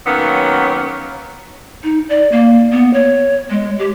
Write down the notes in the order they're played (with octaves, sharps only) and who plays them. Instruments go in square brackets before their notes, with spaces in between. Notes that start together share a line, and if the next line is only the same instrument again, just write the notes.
[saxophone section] D#3 F#3 A#3 B3 C#4
[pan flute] D#4
D5
A#3
B3
C#5
G#3
G4